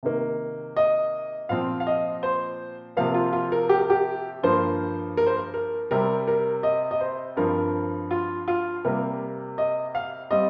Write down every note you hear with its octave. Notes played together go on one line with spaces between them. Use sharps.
C3 D#3 A#3
D#5
A#2 F3 C4 F5
F5
D#5
C5
C3 F3 A#3 F5
F4
F4
A#4
G4
A#4
G4
G2 F3 A#3 C5
A#4
C5
A#4
A#4
C3 G3 C4 A#4
A#4
D#5
D#5
C5
G2 F3 C4 A#4
F4
F4
C3 G3 A#3 A#4
D#5
F5
G3 C4 D#5